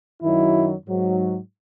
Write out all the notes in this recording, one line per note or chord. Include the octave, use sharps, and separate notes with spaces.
F#2 D#3 F#3 E4
G#2 F#3